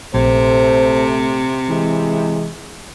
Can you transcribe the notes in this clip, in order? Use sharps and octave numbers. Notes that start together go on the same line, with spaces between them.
A#1 C3 A3 C5
E3 G#3